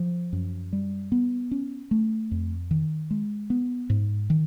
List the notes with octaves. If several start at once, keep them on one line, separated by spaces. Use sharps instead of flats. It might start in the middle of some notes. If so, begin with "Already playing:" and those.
Already playing: F3
F#2
G3
B3
C#4
A3
F2
D#3
G#3
B3
G#2
D#3